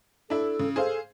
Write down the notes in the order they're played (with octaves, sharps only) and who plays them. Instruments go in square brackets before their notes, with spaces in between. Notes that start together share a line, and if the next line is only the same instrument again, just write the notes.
[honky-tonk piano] D4 E4 [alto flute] A4
[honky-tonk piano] C#3
[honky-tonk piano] G#4 C5 F5 [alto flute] A4